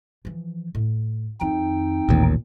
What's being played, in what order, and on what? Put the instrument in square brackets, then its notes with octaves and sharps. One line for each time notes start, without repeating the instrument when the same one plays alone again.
[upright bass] E3 F3
A2
[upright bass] F2 D#3 [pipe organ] C4 D#4 G5
[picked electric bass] A1 D#2 [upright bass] A#2